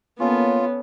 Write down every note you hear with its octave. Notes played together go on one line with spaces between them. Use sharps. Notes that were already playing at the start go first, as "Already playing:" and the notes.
A#3 B3 C#4 F4 A4